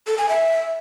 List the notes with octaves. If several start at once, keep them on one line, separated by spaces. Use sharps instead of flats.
A4
G#5
E5